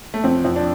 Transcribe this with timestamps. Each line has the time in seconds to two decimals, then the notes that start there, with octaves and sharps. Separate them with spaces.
0.14 A3
0.24 F2 C4
0.45 F2
0.56 D4